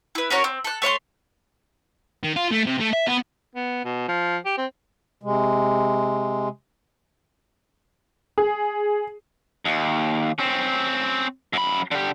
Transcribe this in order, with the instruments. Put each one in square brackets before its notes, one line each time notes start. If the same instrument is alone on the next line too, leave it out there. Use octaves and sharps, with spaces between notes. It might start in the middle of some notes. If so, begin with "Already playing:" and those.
[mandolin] E4 B4
C#4 F#4 A#4 C#5
C4
A4 F#6
A3 C#5 F5 C6
[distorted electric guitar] D#3
F4
A3
C3
A3
E5
B3
[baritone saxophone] B3
B2
F3
G4
C4
[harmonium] C3 G#3
[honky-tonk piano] G#4
[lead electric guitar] D#2
C4 C#4
F#2 B5
D3 G4